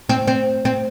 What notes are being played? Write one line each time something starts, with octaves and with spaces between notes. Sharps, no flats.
C4
C4
C4